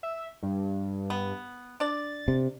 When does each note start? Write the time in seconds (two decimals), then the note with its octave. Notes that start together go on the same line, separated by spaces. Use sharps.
0.03 E5
0.43 G2
1.10 B3
1.80 D4 D5 A6
2.28 C3